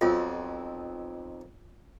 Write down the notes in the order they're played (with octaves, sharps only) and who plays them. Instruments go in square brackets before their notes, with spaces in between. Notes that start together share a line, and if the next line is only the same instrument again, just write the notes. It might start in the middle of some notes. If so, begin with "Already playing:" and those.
[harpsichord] B1 F2 [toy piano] F4